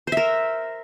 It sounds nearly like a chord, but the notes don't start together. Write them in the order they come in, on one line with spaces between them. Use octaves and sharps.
C5 E5 A#4